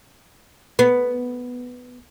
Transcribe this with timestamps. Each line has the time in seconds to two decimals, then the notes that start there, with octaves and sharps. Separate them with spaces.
0.79 B3